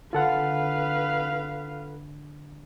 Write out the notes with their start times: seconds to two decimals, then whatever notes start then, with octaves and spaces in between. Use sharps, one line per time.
0.13 D3 F4 A4 B4 F5 F#5